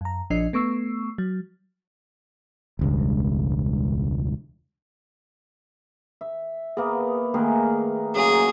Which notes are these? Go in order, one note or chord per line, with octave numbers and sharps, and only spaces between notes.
F#2 A#5
A#1 F3 D4 D#5 C7
A3 B3 C#6 E6 C7
F#3
E1 C#2 G2
E5
A#3 B3 G#4
D#3 A3 A#3 G#4 A#4 B4
C#3 F#3 G#4 A#5